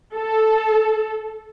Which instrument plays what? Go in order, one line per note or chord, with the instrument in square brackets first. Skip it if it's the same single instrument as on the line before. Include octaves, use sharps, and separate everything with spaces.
[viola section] A4